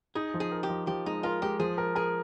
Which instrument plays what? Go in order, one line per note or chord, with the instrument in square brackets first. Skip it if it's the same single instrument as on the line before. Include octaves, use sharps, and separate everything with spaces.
[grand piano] D#4 [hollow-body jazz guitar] G#4
[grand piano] F3
[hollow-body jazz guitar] G#4
[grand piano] A#4
[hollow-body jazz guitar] G4
[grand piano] F3
[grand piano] F3 [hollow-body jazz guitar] G4
[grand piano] G#3 [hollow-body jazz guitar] D#4
[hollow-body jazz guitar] F4 [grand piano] A#4
[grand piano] G#3 [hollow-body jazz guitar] G4
[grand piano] F3 [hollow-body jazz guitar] G#4
[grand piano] A#4
[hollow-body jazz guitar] G#4 [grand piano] A#4